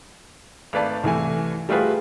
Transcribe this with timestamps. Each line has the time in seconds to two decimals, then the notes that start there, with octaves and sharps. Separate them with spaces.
0.73 G#1 A3 B4 D5 A5
1.04 C2 E3 A3 G#5
1.69 G3 A3 F4 F#4 G#4 B4